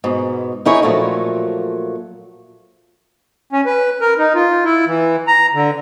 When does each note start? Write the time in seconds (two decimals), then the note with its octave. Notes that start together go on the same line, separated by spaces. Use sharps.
0.04 G#2 B2
0.65 D#3 D#4 E4 G#4 C#5
0.82 A#2 F3 F#3 A3 A#3
3.53 C#4
3.65 B4
4.01 A#4
4.18 D#4
4.34 F4
4.65 E4
4.87 E3
5.27 A#5
5.54 D3